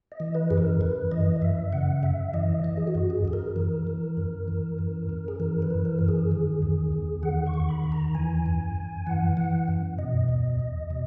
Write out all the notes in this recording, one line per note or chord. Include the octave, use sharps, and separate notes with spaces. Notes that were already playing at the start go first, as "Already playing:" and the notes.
D#5
E3
B4
F#2 G#4
A#4
F#2 B4
E3 D#5
D#5
F#2 E5
C#3 F#5
F#2 E5
E3 D#5
E3 D#5
G#4
F#4
F#2
G#4
F#2 G#4
A#4
E3
E3
F#2
E3
F#2
F#2
G#4
E3 A#4
B4
E3
A#4
F#2 A#4
G#4
D#3
E2
E2
D#3 F#5
C#6
D#3
B5
E2
A#5
E3 G#5
F#2
F#2
E3 F#5
E3 F#5
F#2
B2 D#5
E2
E2
B2